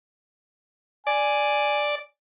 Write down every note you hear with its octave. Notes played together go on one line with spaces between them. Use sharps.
D5 G#5